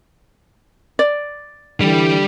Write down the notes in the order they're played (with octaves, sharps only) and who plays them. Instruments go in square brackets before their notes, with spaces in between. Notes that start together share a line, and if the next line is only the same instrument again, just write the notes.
[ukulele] D5
[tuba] D3 [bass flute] E3 [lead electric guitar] G3 G4